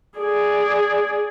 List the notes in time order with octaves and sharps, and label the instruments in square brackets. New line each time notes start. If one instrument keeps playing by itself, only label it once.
[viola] G#4 D5